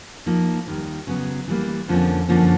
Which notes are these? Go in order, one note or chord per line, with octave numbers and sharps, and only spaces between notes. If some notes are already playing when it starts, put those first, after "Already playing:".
F3 A#3 D#4
D#2 D#3 G3
C#3 F#3 B3
E3 G3 A#3
F2 D3 F3 A#3 C#4
F#2 D3 F3 A#3 C#4